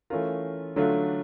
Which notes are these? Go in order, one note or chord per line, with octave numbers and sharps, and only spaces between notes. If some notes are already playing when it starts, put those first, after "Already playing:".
E3 A3 C#4 F4 A#4
D3 F#3 A3 D4 F4